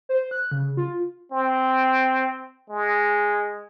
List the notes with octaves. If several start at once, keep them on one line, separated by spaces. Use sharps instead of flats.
C5
F#6
C#3
F4
C4
G#3